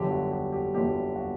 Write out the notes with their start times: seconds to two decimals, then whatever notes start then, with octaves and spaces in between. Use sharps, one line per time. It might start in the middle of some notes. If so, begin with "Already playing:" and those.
Already playing: G1 F#2 D3 F#3 G4
0.11 F#4
0.31 G4
0.52 G4
0.73 G1 F#2 D3 F#3 G4
1.16 F#4